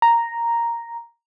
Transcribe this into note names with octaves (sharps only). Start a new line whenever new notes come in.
A#5